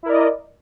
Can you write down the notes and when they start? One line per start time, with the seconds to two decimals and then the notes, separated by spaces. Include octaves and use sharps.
0.03 E4
0.06 A#4
0.09 D5
0.12 D#5